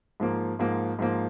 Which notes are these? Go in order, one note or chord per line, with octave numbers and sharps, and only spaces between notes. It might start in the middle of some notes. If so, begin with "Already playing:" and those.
G#2 F3 A#3
G#2 F3 A#3
G#2 F3 A#3